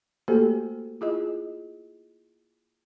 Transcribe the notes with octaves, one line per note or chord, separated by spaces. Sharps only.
A3 A#3 F#4 G4 A4 C5
E4 F4 G#4 D#5